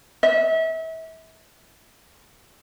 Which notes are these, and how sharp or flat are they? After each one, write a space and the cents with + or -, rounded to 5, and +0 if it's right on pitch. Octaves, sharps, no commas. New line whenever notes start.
E5 -35